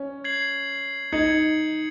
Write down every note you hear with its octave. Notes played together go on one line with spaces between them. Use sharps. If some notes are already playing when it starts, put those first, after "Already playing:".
Already playing: C#4
G#6 C7 F#7
D#4 G#6 C#7 F#7